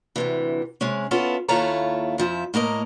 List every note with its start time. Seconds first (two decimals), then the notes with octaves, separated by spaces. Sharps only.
0.16 D2 C3 E3
0.81 C3 G#3 C#4
1.11 B3 C#4 E4 F4 A4
1.48 D#2 E4 F4 A4 C#5 A#5
2.18 F2 F3 E5
2.54 A2 A#3 A#4 D#5